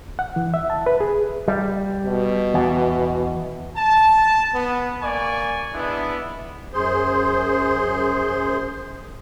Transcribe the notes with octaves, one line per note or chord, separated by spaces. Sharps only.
F#5
E3
E5
A5
B4
G#4
G3
B2
E2
A5
B3
A#3 D5 G#5 C#6
G#3 B3 D4 E4
F#2 G#4 C5 C6